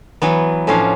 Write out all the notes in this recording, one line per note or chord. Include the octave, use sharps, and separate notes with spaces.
E3 F#3 B3
A2 F3 B3 C#4 D4 F5